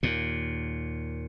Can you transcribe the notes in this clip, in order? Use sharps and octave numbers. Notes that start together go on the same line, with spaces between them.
D#2 A#2